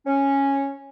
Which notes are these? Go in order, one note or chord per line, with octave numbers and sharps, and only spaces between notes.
C#4